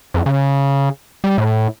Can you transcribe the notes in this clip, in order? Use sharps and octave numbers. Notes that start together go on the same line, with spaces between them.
F2
C#3
G3
A2